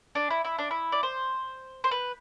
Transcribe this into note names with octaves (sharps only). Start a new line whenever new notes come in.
D4
E4
E4
D4
E4
D5
C5
C5
B4